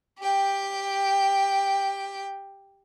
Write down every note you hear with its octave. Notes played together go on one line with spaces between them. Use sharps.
G4 G5